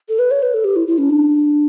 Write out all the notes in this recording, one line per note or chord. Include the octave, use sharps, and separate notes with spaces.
A4
B4
C#5
B4
A4
G4
E4
E4
C#4
D4